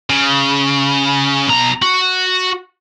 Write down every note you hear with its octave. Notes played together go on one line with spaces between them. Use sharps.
C#3
B1 A#5
F#4